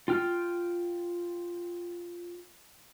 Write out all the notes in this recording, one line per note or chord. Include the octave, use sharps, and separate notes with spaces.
F4 G5 F6